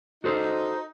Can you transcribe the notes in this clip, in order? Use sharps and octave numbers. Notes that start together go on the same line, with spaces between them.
D#4 F#4 A4 C5